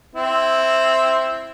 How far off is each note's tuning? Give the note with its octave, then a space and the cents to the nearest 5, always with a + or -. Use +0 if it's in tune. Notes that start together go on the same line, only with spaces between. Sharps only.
C4 +0 E4 -5